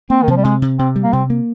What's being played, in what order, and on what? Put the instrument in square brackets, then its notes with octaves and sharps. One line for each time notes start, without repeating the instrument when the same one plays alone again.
[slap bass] A#3 [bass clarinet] C4
[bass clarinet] D#3
[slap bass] C3 [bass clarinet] F3
[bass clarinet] G3
[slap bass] C3 [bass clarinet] G#3
[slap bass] C3
[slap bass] C3 [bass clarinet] C4
[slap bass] G3
[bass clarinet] A#3
[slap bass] C3 [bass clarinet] C4
[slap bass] A#3